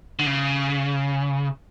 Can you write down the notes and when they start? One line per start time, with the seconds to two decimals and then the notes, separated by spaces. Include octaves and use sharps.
0.19 D3
0.26 C#3